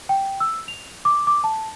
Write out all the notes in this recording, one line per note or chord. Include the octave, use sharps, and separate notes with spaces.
G5
E6
F7
D6
D6
A5